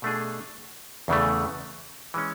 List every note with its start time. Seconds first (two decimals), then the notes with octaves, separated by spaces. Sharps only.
0.02 B2 A3 D4 G#4
1.08 E2 C#3 E3 A3
2.14 E3 G#3 C#4